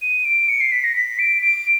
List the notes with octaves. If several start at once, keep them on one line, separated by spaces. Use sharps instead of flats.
D#7
D7
C#7
C7
B6
A#6
B6
D7
D7